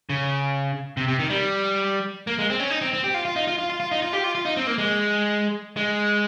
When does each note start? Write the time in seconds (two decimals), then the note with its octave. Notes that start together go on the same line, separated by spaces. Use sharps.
0.10 C#3
0.97 C3
1.08 C3
1.19 D#3
1.30 G3
2.27 A#3
2.39 G#3
2.50 C4
2.60 C#4
2.70 D#4
2.82 C4
2.93 C4
3.04 G4
3.14 F4
3.25 F4
3.36 D#4
3.47 F4
3.59 F4
3.70 F4
3.80 F4
3.91 D#4
4.02 F4
4.13 G4
4.24 F4
4.35 F4
4.45 D#4
4.57 C4
4.67 A#3
4.78 G#3
5.77 G#3